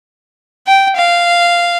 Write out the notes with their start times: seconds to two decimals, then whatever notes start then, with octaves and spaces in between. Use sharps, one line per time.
0.67 G5
0.96 F5